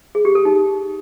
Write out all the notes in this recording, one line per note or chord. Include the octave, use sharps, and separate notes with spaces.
G#4
G4
A4
D#4